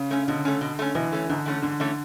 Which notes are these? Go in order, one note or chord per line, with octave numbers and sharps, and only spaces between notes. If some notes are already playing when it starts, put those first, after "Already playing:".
Already playing: C#3
A3 C#4
B2 D3
A3 C#4
B2
A3 C#4
B2 E3
A3 C#4
G#2 D3
E3 A3 C#4
G#2 D3
E3 A3 C#4